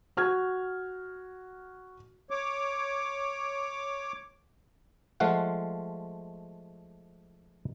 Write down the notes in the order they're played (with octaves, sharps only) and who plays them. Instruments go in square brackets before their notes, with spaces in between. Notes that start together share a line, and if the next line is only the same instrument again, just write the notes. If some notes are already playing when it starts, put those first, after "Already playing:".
[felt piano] F#4 F6 G#6
[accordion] C#5 D6
[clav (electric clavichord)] F3 G#3 A3 F5 F#5